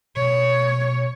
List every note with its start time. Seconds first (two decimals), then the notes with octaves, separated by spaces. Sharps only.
0.17 B2 C#5